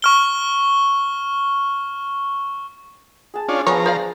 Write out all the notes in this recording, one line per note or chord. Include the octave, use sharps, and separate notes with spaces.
C#6 F6 G7
G#4 A5
C#4 D4 F4
F3 B3 D4 G#4 B4 C#5 A#5
C5 D5 F5